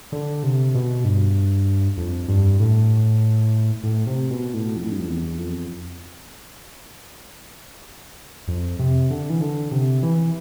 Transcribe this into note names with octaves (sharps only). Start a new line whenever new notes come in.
D3
C3
B2
G2
F2
G2
A2
A2
C3
B2
A2
F2
A2
G2
F2
E2
F2
F2
C3
D3
E3
D3
C3
E3